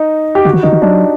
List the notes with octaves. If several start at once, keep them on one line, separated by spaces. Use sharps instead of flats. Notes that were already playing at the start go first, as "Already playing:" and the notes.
Already playing: D#4
G4
D3 F#4
D#3
D3 D#4
D#3
F#3 D4